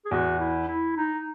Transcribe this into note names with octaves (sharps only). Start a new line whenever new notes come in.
G#4
E2 F#4
E4
E4
D#4